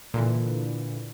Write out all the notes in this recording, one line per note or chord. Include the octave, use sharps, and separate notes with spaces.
A#2 D3 E3